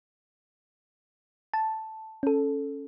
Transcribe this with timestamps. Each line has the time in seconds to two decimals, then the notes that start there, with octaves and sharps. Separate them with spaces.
1.54 A5
2.23 C#4 A4